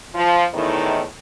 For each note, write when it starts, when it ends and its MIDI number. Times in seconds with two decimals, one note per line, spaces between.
0.14 0.44 53
0.53 1.01 40
0.53 1.01 45
0.53 1.01 51